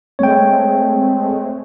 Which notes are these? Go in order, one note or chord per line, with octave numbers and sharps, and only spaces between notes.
G#3 A3 C4 C#5 G5